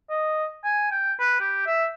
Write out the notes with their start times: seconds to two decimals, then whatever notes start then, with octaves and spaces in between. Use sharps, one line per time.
0.10 D#5
0.64 G#5
0.91 G5
1.19 B4
1.40 G4
1.66 E5